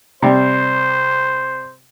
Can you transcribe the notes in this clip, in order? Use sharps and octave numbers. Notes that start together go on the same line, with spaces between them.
C3 G3 C5